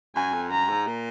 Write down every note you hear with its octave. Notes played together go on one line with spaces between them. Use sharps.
F#2 G#5
F2
F#2 A#5
G#2
A#2